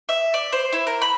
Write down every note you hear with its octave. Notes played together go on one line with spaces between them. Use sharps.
E5
D5
C5
E4
A#4
B5